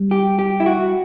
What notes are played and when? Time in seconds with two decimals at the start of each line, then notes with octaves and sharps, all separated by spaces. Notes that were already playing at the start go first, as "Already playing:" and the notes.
Already playing: G3
0.11 G4
0.39 G4
0.60 E4
0.66 F#4